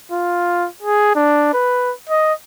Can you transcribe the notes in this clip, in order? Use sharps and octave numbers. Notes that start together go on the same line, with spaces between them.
F4
G#4
D4
B4
D#5